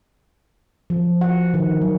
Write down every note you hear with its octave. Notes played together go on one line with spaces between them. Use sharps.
F3
F#5
D#3
F#3